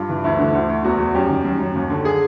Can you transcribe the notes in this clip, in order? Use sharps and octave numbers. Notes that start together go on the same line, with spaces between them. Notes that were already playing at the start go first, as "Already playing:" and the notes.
Already playing: G2 F4
E3
D2 E4
D3
D2
D2
E2 F#4
E2
F#2 G4
D#3
F#2
F#2
D#2
D3
G#4